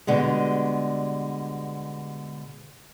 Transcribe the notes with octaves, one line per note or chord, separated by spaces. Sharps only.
B2 D3 G3 G#3